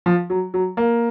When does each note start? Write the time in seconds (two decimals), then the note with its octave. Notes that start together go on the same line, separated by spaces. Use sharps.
0.06 F3
0.30 F#3
0.54 F#3
0.77 A#3